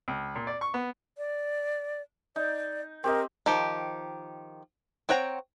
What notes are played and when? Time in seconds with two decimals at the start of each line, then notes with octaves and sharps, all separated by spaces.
0.08 C#2
0.35 A#2
0.47 D5
0.61 C#6
0.74 B3
1.18 D5
2.36 D#4 D5
3.04 C4 G4 A#4 D#5
3.46 D#3 F3 G4
5.09 C4 C#5 F#5 G5 A#5